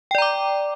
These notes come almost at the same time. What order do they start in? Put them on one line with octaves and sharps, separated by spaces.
G5 D5 A#5 D6